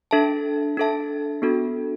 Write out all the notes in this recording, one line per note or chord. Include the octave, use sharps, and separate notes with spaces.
D4 A4 E5 A5
D4 A4 E5 A5
B3 D4 F#4 A4